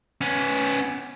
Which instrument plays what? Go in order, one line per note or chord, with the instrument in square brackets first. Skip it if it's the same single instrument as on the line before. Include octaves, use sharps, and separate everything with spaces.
[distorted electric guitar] B3 C#4